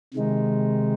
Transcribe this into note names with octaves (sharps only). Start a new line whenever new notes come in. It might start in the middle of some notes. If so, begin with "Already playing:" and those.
C3 D#3 G#3 D#4